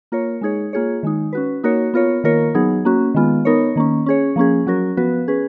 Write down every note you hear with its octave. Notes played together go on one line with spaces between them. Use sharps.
A#3 F4 A#4 C#5
G#3 D#4 G#4 C#5
A#3 F4 G#4 C#5
D#3 G#3 D#4
C#4 F#4 B4
A#3 D#4 F#4 A#4 C#5
B3 F4 A#4 C#5
D#3 A#3 F4 A#4 C#5
F#3 B3 D#4 G#4
A#3 C#4 F#4
D#3 G#3 B3 F4
B3 D#4 A#4 C#5
D#3 A#3 C#4
C#4 G#4 C#5
F3 A#3 C#4 G#4
F#3 C#4 F#4 A#4
F3 B3 F#4 B4
C#4 G#4 B4